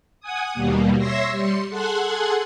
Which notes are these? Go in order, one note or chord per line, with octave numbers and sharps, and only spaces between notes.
F#5 G#5 D#6
D#2 B2 G3 A#3
C#5 E5 C6 E6 A#6 C7
G3 C6 C#7
G#4 A4 F#5 G#5 C6 F#6